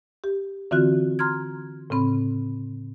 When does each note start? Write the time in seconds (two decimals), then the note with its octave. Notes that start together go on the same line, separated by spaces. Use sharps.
0.24 G4
0.71 D3 E3 C4 F4 F#4 F#6
1.19 A#5 C6 F6 G#6
1.90 A2 C#3 C4 B5